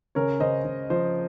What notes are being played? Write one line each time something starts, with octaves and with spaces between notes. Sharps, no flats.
C#3 A#4 C#5
C#3 C5 D#5
C#3
F3 C5